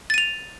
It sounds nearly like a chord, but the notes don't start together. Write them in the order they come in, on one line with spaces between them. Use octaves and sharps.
A6 D#7 F7